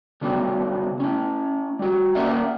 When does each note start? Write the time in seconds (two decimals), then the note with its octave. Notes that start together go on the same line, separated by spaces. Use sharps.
0.21 C#3 F#3 G3 B3
1.00 C#4 E4
1.79 G3 F#4
2.15 A#3 C#4 A#4 D5 E5 F#5